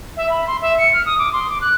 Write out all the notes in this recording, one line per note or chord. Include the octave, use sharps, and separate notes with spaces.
E5
B5
C6
E5
C#7
F6
D#6
D6
C6
D6
F#6